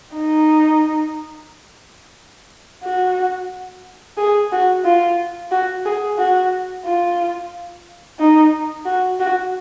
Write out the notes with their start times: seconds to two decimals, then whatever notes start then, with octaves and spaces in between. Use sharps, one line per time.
0.17 D#4
2.84 F#4
4.17 G#4
4.52 F#4
4.85 F4
5.51 F#4
5.86 G#4
6.18 F#4
6.85 F4
8.19 D#4
8.85 F#4
9.20 F#4